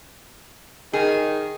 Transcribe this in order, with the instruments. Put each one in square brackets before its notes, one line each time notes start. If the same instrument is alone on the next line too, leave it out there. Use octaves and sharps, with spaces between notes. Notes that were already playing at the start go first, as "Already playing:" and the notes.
[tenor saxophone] D#3 [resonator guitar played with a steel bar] G#4